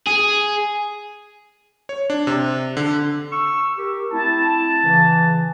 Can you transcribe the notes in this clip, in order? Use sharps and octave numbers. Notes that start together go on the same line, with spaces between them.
G#4
C#5
D4
C3
D3
C#6 E6
G4 A#4
A3 C4 E4 A5
C#3 E3